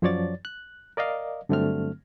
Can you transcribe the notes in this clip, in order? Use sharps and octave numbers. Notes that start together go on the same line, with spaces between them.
F#2 F3 F#3 C#5 D5 A6
F#6
A#4 D5 D#5 F5
G2 D3 F#3 A3 C4 F6